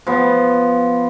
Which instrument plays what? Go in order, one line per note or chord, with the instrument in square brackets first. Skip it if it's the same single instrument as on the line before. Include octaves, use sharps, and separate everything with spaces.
[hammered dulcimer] F3 B3